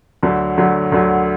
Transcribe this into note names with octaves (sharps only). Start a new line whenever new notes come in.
D2 D3 F#3
D2 D3 F#3
D2 D3 F#3